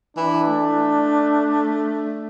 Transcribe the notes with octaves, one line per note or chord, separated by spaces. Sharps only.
E3 D4
A3